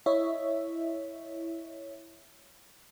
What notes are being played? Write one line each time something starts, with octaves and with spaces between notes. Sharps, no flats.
E4 C#5 D#5 E5